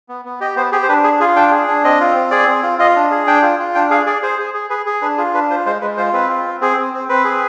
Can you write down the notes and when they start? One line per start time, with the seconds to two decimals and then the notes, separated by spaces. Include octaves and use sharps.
0.09 B3
0.25 B3
0.41 G4 D#5
0.56 B3 C5
0.72 G4 G#4
0.83 C5
0.89 D4 B4
1.04 G#4
1.20 F4 G#4
1.36 D4 G5
1.51 G#4
1.68 D4
1.84 C4 D#5
2.00 F4
2.16 C4
2.31 G#4 D5
2.48 C4
2.63 F4
2.79 F4 D#5
2.96 D4
3.11 G#4
3.27 D4 G5
3.43 F4
3.59 F4
3.75 D4 G5
3.90 G#4 F5
4.06 G#4 D5
4.22 G#4 C5
4.39 G#4
4.54 G#4
4.70 G#4 B4
4.86 G#4
5.02 D4 B4
5.17 F4 G#4
5.34 D4 B4
5.50 F4 C5
5.66 G#3 C5
5.81 G#3 B4
5.97 F4 C5
6.13 C4 B4
6.29 F4
6.46 C4
6.61 C4 G#4
6.77 C4
6.93 C4
7.09 C4 B4
7.24 G#4